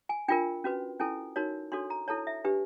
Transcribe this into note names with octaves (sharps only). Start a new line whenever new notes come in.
G#5
D4 F4 A#4 G5
C#4 F#4 B4
C#4 E4 A4 G#5
D#4 F#4 A#4 C#5
D4 F#4 A4 C#5 C6
A#5
E4 A4 C#5 A5
E5
D4 G4 B4